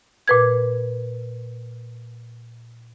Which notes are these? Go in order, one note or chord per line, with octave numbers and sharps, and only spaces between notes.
A#2 B4 G#6